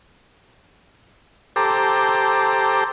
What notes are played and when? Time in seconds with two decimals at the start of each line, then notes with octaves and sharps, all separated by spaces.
1.56 G4 A4 C5 A#5 D6